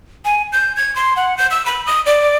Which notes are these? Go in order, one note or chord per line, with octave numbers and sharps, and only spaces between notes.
G#5
G6
G#6
C6
F#5
G6
E6
B5
D#6
D5